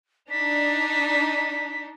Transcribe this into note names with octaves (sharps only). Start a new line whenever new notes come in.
D4 D#4 B6